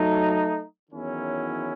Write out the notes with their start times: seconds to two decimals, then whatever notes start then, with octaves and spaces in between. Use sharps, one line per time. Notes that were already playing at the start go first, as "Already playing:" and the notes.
Already playing: F#3 A3 D#4
0.91 E2 D#3 F#3 C#4 E4